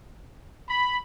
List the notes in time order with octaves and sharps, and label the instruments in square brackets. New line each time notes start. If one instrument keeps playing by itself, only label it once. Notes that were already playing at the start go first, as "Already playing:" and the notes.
[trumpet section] B5